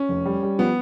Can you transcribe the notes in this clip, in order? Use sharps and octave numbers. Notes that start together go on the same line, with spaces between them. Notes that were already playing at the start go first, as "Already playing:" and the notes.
Already playing: C#4
F1
G3
G3
F3 B3